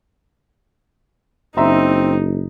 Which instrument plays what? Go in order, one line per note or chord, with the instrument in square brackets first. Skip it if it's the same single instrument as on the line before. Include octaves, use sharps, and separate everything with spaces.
[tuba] F#1 [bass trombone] C4 [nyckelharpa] D#4 [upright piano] E5 A#5 C6